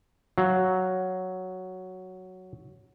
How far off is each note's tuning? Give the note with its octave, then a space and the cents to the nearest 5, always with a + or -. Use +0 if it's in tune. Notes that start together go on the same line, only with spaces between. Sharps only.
F#3 +0 F5 +0